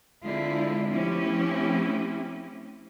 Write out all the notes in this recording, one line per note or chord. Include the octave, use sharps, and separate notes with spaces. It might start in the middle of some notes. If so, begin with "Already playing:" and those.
D3 G#3 C4 E4 F4
F3 A3 C4 C#4 E4 G4